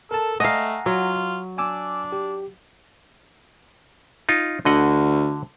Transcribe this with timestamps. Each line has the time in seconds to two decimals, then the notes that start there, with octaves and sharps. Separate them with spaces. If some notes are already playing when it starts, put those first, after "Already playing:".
0.11 A4 A#4 A5
0.40 A3 D#5 F5 F#5 G#5 A#5
0.86 F#3 F4
1.58 D4 G#5 D6 E6
2.12 G4
4.29 D#4 F4
4.65 D2 D3 D#5 F#5